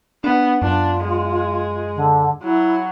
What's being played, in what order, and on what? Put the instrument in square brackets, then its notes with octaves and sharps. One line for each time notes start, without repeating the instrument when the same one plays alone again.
[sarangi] B3 [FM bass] D4
[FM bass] F#2 [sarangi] D4 [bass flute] F4
[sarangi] G#3
[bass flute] D3
[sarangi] F#3 [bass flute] E4